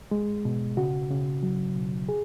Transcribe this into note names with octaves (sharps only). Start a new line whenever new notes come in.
G#3
B2
C#3 F#4
C#3
F#3
B2
G#4